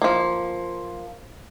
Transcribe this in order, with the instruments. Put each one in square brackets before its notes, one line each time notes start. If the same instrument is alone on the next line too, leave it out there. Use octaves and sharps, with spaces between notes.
[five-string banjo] F3 A#3